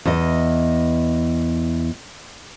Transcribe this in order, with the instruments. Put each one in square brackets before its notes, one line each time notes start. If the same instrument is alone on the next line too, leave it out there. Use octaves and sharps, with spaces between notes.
[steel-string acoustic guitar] E2 D#5